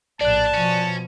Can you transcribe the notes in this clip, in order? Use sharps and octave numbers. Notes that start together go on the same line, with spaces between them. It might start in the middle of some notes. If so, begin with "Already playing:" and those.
A#1 A2 D4 D5 A5 F#6
B2 F3 C#4